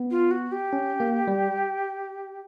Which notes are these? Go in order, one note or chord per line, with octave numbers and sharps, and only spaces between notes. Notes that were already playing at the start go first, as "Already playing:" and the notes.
Already playing: B3
F4
F#4
G4
C#4
A#3
G3